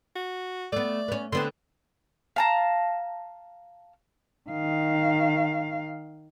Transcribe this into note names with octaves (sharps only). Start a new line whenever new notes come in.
F#4
A3 B3 D5
B3 C#4
D3 B3 C4 C6
F5 A5 A#5
D#3 F5